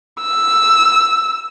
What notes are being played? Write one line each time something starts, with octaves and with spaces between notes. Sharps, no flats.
E6